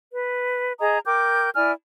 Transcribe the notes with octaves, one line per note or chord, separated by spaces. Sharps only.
B4
G#4 D#5 A#5 D#6
A#4 G5 D6 G6
E4 D5 G#5 F6